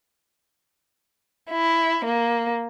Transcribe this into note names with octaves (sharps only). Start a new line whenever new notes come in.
E4
A#3